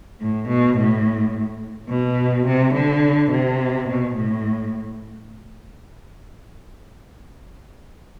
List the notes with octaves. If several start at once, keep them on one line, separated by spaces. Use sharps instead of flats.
A2
B2
A2
B2
C3
D3
C3
B2
A2